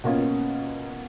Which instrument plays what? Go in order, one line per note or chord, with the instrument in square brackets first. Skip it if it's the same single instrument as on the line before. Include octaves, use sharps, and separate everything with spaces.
[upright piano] B2 A#3 C#4 F4